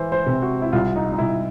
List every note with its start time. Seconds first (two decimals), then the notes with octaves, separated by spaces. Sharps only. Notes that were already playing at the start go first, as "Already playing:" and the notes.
Already playing: E3 C5
0.12 C5
0.26 C3
0.42 F#4
0.62 E4
0.73 C2 F4
0.96 D#4
1.12 D#4
1.19 C2 E4